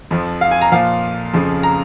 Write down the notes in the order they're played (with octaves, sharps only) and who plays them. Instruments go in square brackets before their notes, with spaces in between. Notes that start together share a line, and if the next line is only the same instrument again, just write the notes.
[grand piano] F2 F3
F5
G#5
A#5
A#2 F3 F5
F2 C#3 F3
A#5